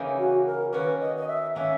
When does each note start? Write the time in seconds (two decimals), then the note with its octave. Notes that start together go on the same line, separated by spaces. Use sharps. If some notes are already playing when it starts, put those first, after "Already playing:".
Already playing: C#3 E3 A#3 D#4
0.18 F#4
0.46 A#4
0.72 D#3 A#3 C#4 F#4 B4
1.00 D#5
1.16 D#5
1.28 E5
1.55 D#3 A#3 C#4 F#4 E5